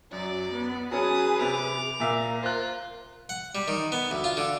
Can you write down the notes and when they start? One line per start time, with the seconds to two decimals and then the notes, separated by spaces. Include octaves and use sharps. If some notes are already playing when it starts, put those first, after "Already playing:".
0.13 F#2 F#3 D5
0.53 B3
0.91 F#3 C#4 G#4 B4 A5 D#6
1.41 C3 D6 F7
2.00 A#2 A#4 E5 F5
2.43 F4 C5 F#6
3.29 F#5
3.55 G3
3.68 D#3
3.92 B3
4.11 D2
4.24 F4
4.37 D3